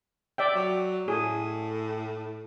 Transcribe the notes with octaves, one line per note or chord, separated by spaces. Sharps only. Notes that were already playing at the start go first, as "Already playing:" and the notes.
D5 E5 G5
F#3
A2 G#4